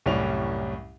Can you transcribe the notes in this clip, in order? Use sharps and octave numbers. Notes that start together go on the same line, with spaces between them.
C2 F#2 A2 G3 C#4 F7